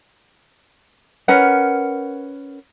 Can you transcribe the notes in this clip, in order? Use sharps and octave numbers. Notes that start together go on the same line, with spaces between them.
C#4 A#4 B4 F#5